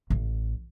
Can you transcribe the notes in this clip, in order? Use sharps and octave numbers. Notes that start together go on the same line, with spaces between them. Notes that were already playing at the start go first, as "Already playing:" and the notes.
A1